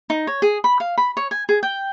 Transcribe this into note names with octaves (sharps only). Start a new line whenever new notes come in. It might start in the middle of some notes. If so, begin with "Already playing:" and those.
D#4
C#5
G#4
B5
F5
B5
C#5
G#5
G#4
G5